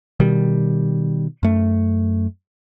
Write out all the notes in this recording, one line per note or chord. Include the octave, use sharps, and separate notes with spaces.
B2 D#3 G3
F#2 A3